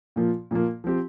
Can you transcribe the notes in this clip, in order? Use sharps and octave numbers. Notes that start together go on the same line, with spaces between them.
A#2 F3 A#3
A#2 F3 A#3
F3 C4 G4